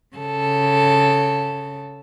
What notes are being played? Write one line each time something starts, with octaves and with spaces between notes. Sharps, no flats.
C#3 A4